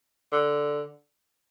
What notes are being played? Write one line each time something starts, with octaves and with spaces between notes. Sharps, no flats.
D3